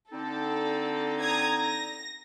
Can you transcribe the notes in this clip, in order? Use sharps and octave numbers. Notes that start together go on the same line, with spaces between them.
D3 C4 D#4 A4
A#5 D#6 G#6
A#6